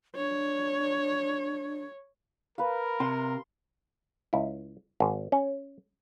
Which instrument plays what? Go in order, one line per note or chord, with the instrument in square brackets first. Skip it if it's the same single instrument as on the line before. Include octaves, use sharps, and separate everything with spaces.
[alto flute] D4 [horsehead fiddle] C#5
[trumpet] A#4 [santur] B4 F5
[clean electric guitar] C3 [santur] C6
[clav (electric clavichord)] C#2 E4
G#1
C#4